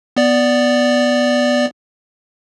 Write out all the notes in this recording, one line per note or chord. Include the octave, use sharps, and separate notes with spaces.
B3 D5